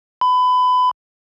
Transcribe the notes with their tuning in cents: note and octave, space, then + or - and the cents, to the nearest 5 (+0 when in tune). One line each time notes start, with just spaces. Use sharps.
B5 +25